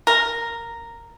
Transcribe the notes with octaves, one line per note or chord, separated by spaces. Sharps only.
A#4